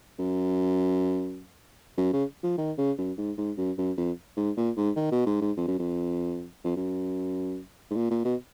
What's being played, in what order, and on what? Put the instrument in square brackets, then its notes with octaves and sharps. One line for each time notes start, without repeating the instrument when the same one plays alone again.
[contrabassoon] F#2
F#2
C#3
F3
D#3
C#3
F#2
G#2
G#2
F#2
F#2
F2
G#2
A#2
G#2
D#3
B2
G#2
G#2
F2
F#2
F2
F2
F#2
G#2
A#2
A#2
B2